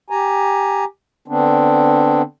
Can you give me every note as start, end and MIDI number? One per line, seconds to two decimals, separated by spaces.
0.10 0.84 67
0.10 0.84 80
0.10 0.84 82
1.28 2.22 50
1.28 2.22 59
1.28 2.22 60
1.28 2.22 62